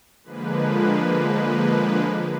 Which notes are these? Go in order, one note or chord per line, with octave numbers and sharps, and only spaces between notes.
D3 F3 G#3 A#3 B4